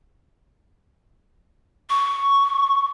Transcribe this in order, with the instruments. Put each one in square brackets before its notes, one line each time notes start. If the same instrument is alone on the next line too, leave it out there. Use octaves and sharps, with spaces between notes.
[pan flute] C#6